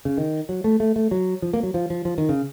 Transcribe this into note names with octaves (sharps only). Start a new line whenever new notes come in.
C#3
D#3
F#3
A3
A3
A3
F#3
F3
A#3
F#3
F3
F3
F3
D#3
C#3